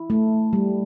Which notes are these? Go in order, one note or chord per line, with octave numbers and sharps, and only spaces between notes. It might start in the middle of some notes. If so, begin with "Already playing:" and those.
Already playing: E4
A3
G3